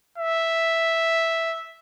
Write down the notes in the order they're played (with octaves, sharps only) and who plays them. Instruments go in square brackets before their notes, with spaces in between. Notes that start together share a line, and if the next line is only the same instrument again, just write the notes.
[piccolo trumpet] E5